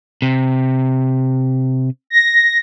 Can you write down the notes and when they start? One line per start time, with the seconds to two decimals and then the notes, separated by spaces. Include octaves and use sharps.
0.22 C3
2.10 A#6